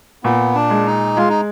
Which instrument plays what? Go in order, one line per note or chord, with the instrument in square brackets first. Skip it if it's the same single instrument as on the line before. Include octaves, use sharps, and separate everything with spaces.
[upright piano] A#2 [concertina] B3
[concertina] D4
[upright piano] G#3
[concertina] D#4
[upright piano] G#3 [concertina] F4
[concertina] D#4